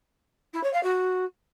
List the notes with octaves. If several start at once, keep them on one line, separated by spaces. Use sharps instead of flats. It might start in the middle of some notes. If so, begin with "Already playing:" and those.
E4
C#5
F5
F#4